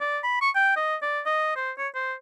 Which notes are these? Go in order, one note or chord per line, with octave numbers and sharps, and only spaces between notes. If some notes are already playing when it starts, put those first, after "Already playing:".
D5
B5
C#6
G5
D#5
D5
D#5
C5
C#5
C5